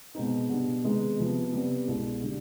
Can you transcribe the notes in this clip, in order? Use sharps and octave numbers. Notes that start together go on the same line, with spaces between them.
B2 G#3 C4 D#4
B2 G3 D4
C3 D#3 G#3 B3 D#4
F2 C3 F3 B3
C3 G3 B3
C2 B2 G#3
D3 G3